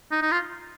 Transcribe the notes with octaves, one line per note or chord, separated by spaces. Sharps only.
D#4
D#4
F4